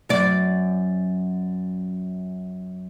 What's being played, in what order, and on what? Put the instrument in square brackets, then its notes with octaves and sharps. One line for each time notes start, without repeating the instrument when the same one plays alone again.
[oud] F#2 D5